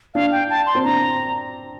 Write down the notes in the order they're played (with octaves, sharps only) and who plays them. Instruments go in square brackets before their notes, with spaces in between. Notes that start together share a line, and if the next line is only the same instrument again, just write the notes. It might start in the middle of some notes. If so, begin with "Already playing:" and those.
[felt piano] D4 [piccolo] F5
[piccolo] G5
A5
C6
[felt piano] C4
[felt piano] D4 [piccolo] A#5